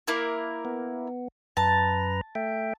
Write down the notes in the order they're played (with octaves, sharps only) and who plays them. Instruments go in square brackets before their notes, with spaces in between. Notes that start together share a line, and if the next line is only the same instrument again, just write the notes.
[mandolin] A#3 E4 A#4
[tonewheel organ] B3
[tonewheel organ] F#2 B4 A#5 [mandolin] A5
[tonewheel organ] A3 E5 G5